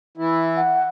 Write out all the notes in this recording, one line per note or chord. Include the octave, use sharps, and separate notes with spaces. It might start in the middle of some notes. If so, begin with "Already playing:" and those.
E3 E4
F#5